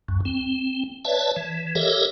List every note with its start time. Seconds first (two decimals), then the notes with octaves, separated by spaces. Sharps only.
0.08 C#2 F#2
0.25 C4
1.05 B4 C#5 D5 E5 A5
1.36 E3
1.75 G4 A4 A#4 C#5 D#5 E5